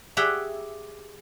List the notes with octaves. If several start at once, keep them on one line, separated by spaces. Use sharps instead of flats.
G4 G#4 E5 F#5 G5